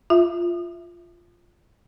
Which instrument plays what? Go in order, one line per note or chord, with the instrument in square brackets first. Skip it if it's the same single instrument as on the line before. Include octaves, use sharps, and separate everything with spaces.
[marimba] F4 E5